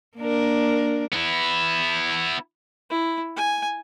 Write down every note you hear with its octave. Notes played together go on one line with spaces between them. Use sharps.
A#3 D4 A#4
B3 E4
E4
G#5